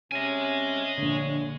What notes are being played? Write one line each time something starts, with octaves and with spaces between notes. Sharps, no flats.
C3 C#4 D#5 G#5
A#1 D3 C#5